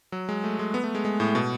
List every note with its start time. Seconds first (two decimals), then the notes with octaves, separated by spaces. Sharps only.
0.12 F#3
0.29 G#3
0.44 A3
0.59 G#3
0.74 B3
0.84 A3
0.95 G#3
1.05 G#3
1.20 A2
1.35 B2